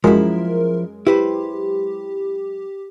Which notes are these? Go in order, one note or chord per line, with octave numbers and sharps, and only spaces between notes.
F#2 F3 G#3 E4 A#4
E4 G4 B4 C5